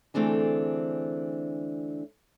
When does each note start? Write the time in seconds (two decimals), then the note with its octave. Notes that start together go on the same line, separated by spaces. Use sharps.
0.14 D3 E3 A3 C4 D4 G#4